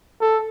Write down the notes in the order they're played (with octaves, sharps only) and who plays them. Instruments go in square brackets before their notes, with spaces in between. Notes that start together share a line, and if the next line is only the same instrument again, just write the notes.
[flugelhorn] A4